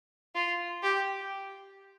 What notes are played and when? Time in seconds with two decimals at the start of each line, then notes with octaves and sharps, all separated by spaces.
0.35 F4
0.83 G4